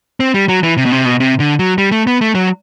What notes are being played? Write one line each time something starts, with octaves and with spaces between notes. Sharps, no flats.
C4
G3
F#3
E3
C3
B2
C3
B2
C3
D3
F#3
G3
A3
B3
A3
F#3